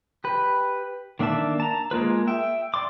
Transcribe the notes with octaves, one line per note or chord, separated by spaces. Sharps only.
G4 B4
D#3 A#3 D4 E5 A5
A5 A#5
G#3 A#3 F4 B4
E5 G5
D5 C6 D6